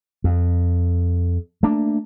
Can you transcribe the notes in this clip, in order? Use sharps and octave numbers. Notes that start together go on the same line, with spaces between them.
F2
A3 A#3 D4